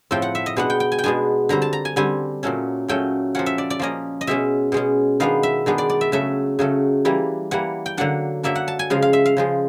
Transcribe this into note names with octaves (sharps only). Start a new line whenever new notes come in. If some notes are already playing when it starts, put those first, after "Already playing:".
A2 F3 A3 C4 G5
F#5
E5
D#5
B2 G#3 B3 D4 F#5
G5
G5
G#5
G5
B2 G#3 B3 D4 G#5
D3 G3 C4 A#5
A5
A#5
G#5
D3 G3 C4 G#5
A#2 F#3 A3 C#4
A#2 F#3 A3 C#4 G5
F3 A#3 C#4 F#5
E5
D5
D5
F3 A#3 C#4 D#5
D#5
B2 G#3 C#4 E5
B2 G#3 C#4
D#3 G#3 B3 D4 F5
E5
D#3 G#3 B3 D4
D5
D5
E5
C#3 F#3 A3 E5
C#3 F#3 A3
E3 G3 A#3
E3 G3 A#3 F#5
G5
D3 F#3 A#3 D4 F#5
D3 F#3 A#3 D4 E5
F#5
A5
G#5
C#3 F3 G#3 F5
F5
E5
F5
C#3 F3 G#3